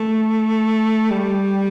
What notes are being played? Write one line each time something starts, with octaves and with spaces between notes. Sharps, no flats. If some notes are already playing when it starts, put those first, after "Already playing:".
Already playing: A3
G3